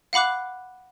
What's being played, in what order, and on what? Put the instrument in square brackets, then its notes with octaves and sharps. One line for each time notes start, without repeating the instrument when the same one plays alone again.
[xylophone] F5 F#5 B5 D6 F#6